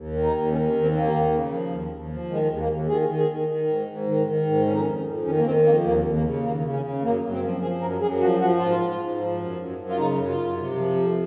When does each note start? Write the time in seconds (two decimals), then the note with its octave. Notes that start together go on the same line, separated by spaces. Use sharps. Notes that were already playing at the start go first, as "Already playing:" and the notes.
Already playing: D#2
0.13 D#3
0.23 D#4
0.33 D#2
0.52 D#3 C#4
0.72 D#2
0.82 C4
0.92 D#3
0.97 A#3
1.11 D#2
1.31 C#3
1.51 F3
1.70 D#2
1.90 D#2
2.10 F3
2.29 D#3 G#3
2.50 D#2 G#3
2.59 A#3
2.70 D#2
2.88 D#3 G#4
3.09 D#3
3.18 G#4
3.28 D#3
3.48 D#3
3.67 G#2
3.88 G#2
4.07 D#3
4.27 D#3
4.46 G#2
4.66 F2 C#4
4.73 D#4
4.81 C#4
4.86 F2
5.05 F2
5.25 D#3 C#4
5.38 A#3
5.45 D#3 C4
5.64 F2 A#3
5.84 D#2 A#3
6.04 D#2
6.14 A#3
6.24 C#3
6.43 D#2 A#3
6.62 C#3
6.72 C#4
6.83 C#3
7.02 F#2 A#3
7.22 F#2
7.32 C4
7.42 F3
7.61 F3 G#4
7.81 F#2 A#4
8.01 F#2 G#4
8.20 F3 F#4
8.40 F3 F#4
8.60 G#2 F4
8.79 G#2
8.99 G#2
9.19 F3
9.38 F#2
9.58 F#2
9.78 F#2
9.89 F4
9.97 C#3 D#4
10.17 F#2
10.27 F4
10.37 F#2
10.57 C3
10.77 F3
10.96 F2